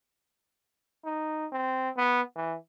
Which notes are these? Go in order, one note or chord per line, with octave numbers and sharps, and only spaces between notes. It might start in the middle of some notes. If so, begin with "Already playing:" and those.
D#4
C4
B3
E3